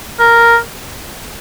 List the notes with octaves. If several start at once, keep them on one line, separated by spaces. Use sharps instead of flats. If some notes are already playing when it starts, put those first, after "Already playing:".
A#4